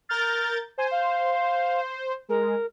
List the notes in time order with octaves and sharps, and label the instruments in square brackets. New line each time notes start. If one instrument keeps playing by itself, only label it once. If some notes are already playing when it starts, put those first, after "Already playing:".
[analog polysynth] A#4 G6 A6 [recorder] F6
[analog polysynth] C5 [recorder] G#5
[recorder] F5
[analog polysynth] G#3 [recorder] A#4